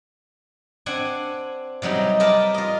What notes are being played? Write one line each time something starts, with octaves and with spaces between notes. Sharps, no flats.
C4 D4 F#5 G#5
C3 F#3 G3 D#4
A#4 B4 D5 E5 G5 A5
F4 D#5